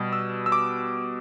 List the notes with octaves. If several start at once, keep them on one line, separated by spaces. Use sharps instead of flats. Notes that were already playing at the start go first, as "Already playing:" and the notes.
Already playing: B2 G3
E6
E6
D6